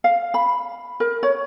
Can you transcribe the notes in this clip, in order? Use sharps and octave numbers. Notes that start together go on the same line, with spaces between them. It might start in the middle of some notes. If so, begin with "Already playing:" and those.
F5
B5
A#4
C#5